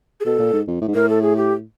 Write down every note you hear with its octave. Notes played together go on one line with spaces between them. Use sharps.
G#4
B2 A4
A#2
G#2
F2
A2
G#2
A2 A#4
A4
G#4
G4